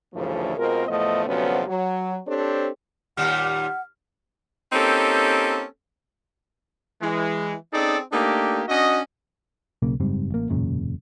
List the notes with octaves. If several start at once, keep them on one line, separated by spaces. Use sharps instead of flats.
D2 G2 C#3 E3 F3 A3
B2 G#3 C4 F4 A#4
E2 A2 F3 A3 B3 D#5
D2 C3 F3 F#3 B3 C#4
F#3
C4 D4 G4 A4 C5 C#5
D#2 A#2 G3 F#5 F6
A#3 C4 C#4 D#4 G4 A4
E3 G#3
C4 C#4 D#4 G#4 A4 D5
A3 A#3 D4 D#4 G4
C#4 D4 F#4 D#5
B1 C#3 A#3
F#1 G#2 G3 C4
A1 A#3
E1 F#2 A#2 C#3